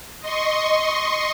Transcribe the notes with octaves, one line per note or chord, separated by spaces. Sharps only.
D#5 C6 C#6